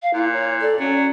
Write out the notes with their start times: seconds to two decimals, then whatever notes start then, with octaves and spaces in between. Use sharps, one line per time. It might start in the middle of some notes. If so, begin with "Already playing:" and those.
0.02 F5
0.14 A#2 E4
0.33 C#5
0.61 A4 D5
0.80 F#3 C#4